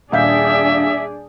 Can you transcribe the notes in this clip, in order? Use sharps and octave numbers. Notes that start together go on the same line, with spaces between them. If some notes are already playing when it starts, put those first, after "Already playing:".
D#1 D4 G#4 D5 E5 F5 G6